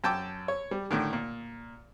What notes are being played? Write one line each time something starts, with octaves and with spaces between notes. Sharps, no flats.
F#2 G5 A5 D6 E6
C#5
G3
A2 D3 D#3
A#2